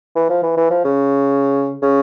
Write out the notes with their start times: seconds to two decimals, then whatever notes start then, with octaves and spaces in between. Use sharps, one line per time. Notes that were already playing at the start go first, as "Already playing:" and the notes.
0.15 E3
0.29 F3
0.43 E3
0.57 E3
0.70 F3
0.84 C#3
1.82 C#3